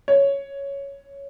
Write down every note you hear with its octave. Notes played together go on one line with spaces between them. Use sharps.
C#5